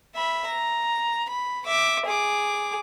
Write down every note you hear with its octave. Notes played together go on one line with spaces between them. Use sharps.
E5 B5
A#5
B5
E5 D6
G#4 D6